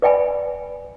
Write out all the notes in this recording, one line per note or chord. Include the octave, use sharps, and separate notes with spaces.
B4 D5 G5 G#5 B5